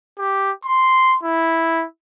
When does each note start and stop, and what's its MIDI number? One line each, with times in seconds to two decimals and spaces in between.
0.19 0.51 67
0.65 1.16 84
1.24 1.84 64